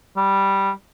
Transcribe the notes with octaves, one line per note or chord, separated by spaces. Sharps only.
G3